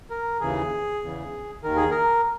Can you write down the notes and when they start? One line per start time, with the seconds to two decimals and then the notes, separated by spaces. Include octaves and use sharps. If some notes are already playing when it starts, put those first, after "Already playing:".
0.10 A#4
0.41 D#2 C#3 E3 G#4
1.02 E2 C#3 E3
1.63 D#2 D#3 A#4
1.76 G#4
1.91 A#4